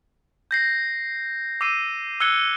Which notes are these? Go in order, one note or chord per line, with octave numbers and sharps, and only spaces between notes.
G6 A#6 C7
D6 E6 C7 D#7
E6 F#6 G#6 C#7 G7